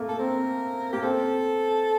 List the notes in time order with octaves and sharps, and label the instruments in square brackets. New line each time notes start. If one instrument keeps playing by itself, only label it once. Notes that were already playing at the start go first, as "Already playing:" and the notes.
Already playing: [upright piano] A3 A#3
[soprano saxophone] A4
[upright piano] C4 [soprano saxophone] A#4
[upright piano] A#3 [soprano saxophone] G4
[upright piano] C4 [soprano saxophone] A4